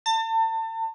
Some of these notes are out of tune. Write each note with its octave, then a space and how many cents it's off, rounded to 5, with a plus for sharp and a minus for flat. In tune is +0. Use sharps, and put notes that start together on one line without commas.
A5 +35